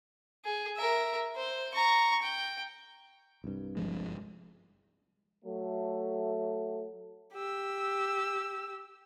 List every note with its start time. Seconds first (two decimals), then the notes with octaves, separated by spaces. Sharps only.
0.45 G#4
0.77 A#4 E5
1.36 C5
1.74 A#5 C#6
2.22 G5
3.44 C2 G2
3.77 G1 F3 G#3
5.43 F#3 A3
7.33 G4 E6